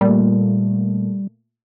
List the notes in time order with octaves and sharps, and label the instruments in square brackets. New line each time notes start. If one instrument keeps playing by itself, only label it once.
[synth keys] A#2 A3 [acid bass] G3